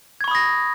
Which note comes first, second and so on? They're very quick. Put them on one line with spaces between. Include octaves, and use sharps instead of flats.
G#6 C#6 B5 D#6 A#6